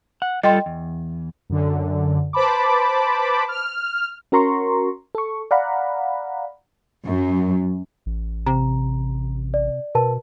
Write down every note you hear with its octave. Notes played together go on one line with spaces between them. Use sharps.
F#5
G3 F4 A4 D#5 G5 C6
E2
F#2 D3
B4 C5 A5 B5 D6
F6
C#4 F#4 A#4 A#5 C6 C#6
A4 C#6
D5 F5 F#5 A#5 B5
F#2
A1
C3 A#5
D5
B2 A#4 B4 A5